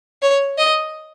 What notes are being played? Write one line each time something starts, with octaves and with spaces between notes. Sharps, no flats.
C#5
D#5